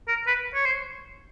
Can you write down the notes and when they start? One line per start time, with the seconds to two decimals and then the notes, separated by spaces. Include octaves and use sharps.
0.08 A#4
0.27 B4
0.54 C#5
0.66 C5